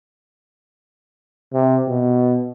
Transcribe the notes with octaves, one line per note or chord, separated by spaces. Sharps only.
C3
B2